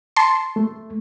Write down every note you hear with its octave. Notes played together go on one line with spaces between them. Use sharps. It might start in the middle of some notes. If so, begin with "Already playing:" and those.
A5 C6
A3